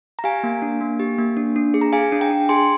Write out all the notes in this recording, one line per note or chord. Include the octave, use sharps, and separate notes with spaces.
A#5
G4 F5 G#5
A#3
D4
A#3
G4
A#3
D4
D4
G#4
A#5
G#4 F5 G#5
D4
G5 A#5
D4
G#4 G#5 C6